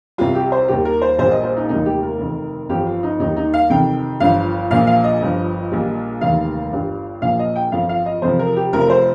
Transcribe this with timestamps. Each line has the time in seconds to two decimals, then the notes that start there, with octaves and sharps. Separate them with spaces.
0.18 C2 C3 G3 F4
0.35 G4
0.52 C5
0.68 D#2 D#3 G3 G4
0.85 A#4
1.02 C5
1.19 A#1 A#2 G3 C5
1.31 D#5
1.44 C5
1.57 D#4
1.69 F1 D#2 D#3 G3 D#4
1.86 G4
2.03 A#4
2.19 F1 F2 D#3
2.69 G1 F2 F3 G4
2.87 F4
3.03 D#4
3.19 D#2 D#3 G3 D#4
3.37 D#4
3.54 F5
3.70 F2 C3 D#3 G5
4.20 G1 G2 F3 F5
4.71 A#1 A#2 F3 F5
4.87 F5
5.04 D#5
5.21 G1 G2 F3
5.71 A#1 A#2 G3
6.21 F1 D#2 D#3 G3 F5
6.72 G1 G2 G3
7.22 A#1 A#2 F3 F5
7.39 D#5
7.56 G5
7.72 G1 F2 F3 F5
7.89 F5
8.06 D#5
8.22 F2 C3 F3 C5
8.39 A#4
8.56 G4
8.73 F1 F2 C3 F3 A#4
8.90 C5